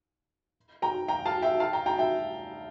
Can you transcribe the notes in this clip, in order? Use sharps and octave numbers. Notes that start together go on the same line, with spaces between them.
G5 A#5
G5 A#5
F5 A5
E5 G5
F5 A5
G5 A#5
G5 A#5
E5 G5